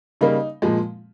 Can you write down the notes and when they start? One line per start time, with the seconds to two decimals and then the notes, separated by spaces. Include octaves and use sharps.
0.21 C#3 G3 A#3 D#4
0.62 A#2 F3 G#3